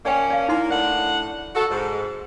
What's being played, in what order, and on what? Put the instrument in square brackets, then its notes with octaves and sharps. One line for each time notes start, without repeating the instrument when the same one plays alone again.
[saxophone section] F3 A#3 C#4 [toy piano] D5 G5 G#5
[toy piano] D5 F5
[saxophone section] A#3 [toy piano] D#4 E4 C6
[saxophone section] A2 D4 F#5
F#4 A4
G#2